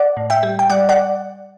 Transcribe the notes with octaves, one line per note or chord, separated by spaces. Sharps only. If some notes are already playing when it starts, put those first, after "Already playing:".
Already playing: D5 F#5
A2
E5 G5
G3
G5
G3 D5 F#5
D5 F#5